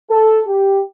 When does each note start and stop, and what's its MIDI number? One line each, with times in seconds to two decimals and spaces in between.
0.11 0.40 69
0.46 0.79 67